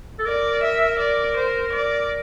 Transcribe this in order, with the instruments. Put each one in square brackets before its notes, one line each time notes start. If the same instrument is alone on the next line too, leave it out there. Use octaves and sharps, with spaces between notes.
[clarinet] A4
[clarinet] A#4 [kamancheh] D5
[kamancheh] E5
D5
C5
D5